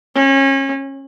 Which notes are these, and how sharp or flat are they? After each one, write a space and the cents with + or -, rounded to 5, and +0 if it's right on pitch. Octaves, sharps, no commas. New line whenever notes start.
C#4 -30